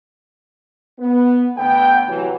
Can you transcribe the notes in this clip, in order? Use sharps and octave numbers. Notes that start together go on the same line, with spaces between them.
B3
E2 D3 A3 B3 G5
C3 E3 F#3